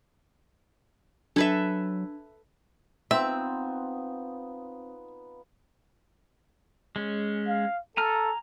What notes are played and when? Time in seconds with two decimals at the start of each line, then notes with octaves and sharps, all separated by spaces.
1.36 F#3 D4 A4 B4 E5 G#6
3.11 B3 C4 D#4 F4 E5
6.96 G#3 C#4
7.47 F5
7.97 A4 G#5 A#5 F6